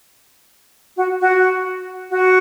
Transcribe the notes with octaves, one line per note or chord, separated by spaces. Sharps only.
F#4
F#4
F#4